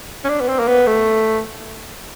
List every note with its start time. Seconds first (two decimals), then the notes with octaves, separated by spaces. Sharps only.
0.24 C#4
0.29 D4
0.40 B3
0.48 C4
0.59 A#3
0.67 B3
0.87 A3